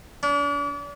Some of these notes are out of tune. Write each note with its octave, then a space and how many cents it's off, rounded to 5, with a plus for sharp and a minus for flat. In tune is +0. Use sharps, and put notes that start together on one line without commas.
D4 -40